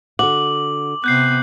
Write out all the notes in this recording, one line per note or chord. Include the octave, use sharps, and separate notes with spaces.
D3 F#4 F#5 D6 F#7
C3 B3 F#6 G6 C7